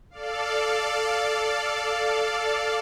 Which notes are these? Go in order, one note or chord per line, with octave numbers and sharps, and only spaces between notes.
A4 D5 F5